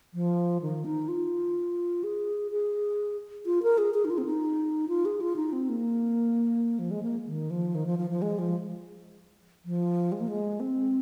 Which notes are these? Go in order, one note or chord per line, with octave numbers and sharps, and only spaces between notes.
F3
D#3
D#4
F4
G#4
G#4
F4
A#4
G#4
G#4
D#4
F4
C4
D#4
F4
G#4
F4
D#4
C4
A#3
F3
G#3
A#3
D#3
F3
D#3
F3
F3
F3
G#3
F3
F3
G#3
A#3
G#3
C4